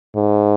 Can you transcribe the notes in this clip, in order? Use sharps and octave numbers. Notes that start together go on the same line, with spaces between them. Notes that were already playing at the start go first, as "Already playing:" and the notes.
G#2